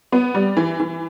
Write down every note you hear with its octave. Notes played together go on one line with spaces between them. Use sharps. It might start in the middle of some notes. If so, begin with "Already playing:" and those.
B3
G3
E3
E3